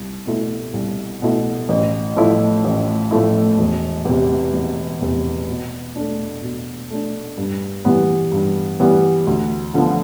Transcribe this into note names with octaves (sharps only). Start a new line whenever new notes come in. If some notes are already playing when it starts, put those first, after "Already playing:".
Already playing: C2
B2 A3 E4
C2
B2 A3 E4
A1
A2 F3 A3 E4
A1
A2 F3 A3 E4
E1
E2 C3
E1
E2 C3
B2
A3 D4
B2
A3 D4
G2
E3 G3 B3
G2
E3 G3 B3
D2
D3 F3 B3